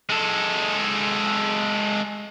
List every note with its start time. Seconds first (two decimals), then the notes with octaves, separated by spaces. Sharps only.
0.09 G#3 A4